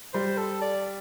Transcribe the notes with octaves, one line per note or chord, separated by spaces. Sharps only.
G3 C5
A4
D5